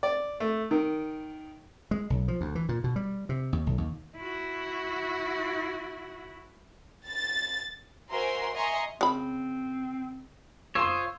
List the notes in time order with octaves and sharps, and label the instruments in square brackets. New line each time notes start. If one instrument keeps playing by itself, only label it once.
[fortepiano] D5
A3
D#3
[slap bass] G#3
B1
F3
D2
E3
A#2
B2
G3
C3
D#2
B1
D#2
[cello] E4 F#4
[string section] A6
[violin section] F#4 A#4 C5 E5 G#5 C6
D#5 E5 G#5 A#5 C6 C#6
[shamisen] C#3 B5 [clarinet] C4
[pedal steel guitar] F4 C5 C#5 [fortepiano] C6 E6 [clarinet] D#6